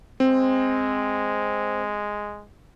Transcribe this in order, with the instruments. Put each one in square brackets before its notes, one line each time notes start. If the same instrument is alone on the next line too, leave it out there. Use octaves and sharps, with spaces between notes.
[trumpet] G#3 [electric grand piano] C4